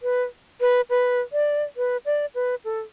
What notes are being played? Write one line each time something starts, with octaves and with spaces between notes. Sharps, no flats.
B4
B4
B4
D5
B4
D5
B4
A4